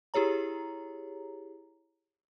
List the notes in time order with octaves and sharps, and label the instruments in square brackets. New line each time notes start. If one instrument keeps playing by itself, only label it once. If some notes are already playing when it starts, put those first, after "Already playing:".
[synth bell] E4 G4 G#4 C#5 A#5